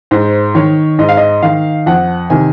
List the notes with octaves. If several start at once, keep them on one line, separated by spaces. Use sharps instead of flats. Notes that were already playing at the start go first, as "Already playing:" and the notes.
G#2 C5
D#3 C#5
G#2 D#5
F5
D#5
D#3 F5
F2 F#5
C3 D#3 G#5